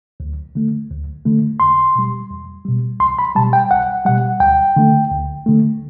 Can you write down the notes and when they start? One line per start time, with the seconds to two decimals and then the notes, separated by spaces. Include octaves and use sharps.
0.20 D2
0.55 D3 A3
0.90 D2
1.25 D3 A3
1.60 E2 C6
1.96 B2 G3
2.31 E2
2.65 B2 G3
3.00 C2 C6
3.19 B5
3.36 B2 G3 A5
3.53 G5
3.71 C2 F#5
4.05 B2 G3 F#5
4.40 D2 G5
4.76 D3 A3
5.12 D2
5.46 D3 A3